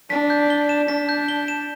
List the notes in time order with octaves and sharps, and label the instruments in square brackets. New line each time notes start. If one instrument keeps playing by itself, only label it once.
[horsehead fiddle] D4 [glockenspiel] B6
[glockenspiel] G6
G7
E7
[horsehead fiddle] D4 [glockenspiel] B6
[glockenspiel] G6
G7
E7